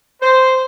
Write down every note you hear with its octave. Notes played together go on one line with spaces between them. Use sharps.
C5